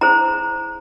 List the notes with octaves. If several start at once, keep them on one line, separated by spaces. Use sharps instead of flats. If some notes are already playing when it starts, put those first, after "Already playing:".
E4 G#4 C5 A#5